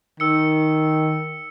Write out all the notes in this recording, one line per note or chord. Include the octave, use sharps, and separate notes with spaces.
D#3 E6 C#7